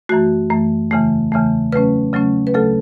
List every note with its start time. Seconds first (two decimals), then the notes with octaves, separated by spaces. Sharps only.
0.09 F#2 E3 A3 F#4
0.50 F#2 E3 A3
0.91 E2 C#3 E3 A3
1.32 E2 C#3 E3 A3
1.72 C#3 F#3 A3 C#4 B4
2.13 C#3 F#3 A3 C#4
2.47 B4
2.54 D2 C#3 F#3 A3 A4